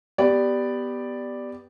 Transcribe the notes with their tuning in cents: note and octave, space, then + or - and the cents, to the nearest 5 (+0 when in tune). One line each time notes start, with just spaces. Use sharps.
B3 +0 G4 +0 D5 +0